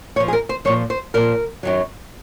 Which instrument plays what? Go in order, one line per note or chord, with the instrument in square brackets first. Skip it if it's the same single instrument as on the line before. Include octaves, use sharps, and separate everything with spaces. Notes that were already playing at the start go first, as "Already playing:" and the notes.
[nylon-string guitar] A#2 F3 C#5
G#4
A#4
C5
A#2 F3 C#5
C5
A#2 F3 A#4
F#2 D#3 F#3